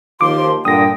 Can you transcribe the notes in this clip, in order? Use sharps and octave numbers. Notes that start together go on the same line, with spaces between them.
D#2 F3 C6 D6
G2 A#2 D3 G5 D#6 A#6